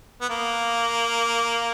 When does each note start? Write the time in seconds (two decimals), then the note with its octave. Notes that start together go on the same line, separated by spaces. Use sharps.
0.21 B3
0.30 A#3